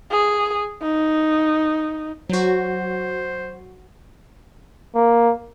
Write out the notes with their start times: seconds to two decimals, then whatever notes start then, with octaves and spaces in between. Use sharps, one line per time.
0.11 G#4
0.83 D#4
2.29 F#3 F#4 C5
4.95 A#3